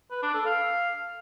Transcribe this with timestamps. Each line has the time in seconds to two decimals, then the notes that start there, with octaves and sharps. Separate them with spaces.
0.11 B4
0.22 D4
0.34 A4
0.46 F5